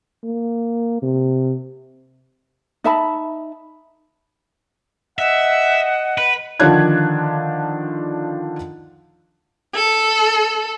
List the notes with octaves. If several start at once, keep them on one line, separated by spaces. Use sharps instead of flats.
A#3
C3
D#4 E5 A5 B5
D#5 E5 F#5
B4
D3 D#3 F3 D4 F#6 G#6
A4